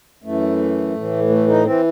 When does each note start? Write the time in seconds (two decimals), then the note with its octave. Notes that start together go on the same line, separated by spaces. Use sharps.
0.23 F#2 E3 A3
0.95 A2 E3
1.30 A3
1.48 D#4
1.65 E3 C4